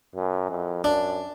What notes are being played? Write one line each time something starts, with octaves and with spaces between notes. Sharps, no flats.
F#2
F2
F#2 D4